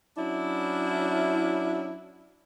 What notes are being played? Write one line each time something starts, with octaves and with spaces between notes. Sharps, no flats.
F#3 C#4 D4 E4